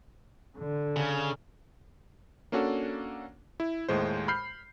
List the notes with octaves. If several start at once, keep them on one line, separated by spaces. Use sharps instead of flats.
D3
C#3
A#3 C#4 D4 F#4 A4
E4
D#2 A2 G#3 C5
B5 F6 G6 C7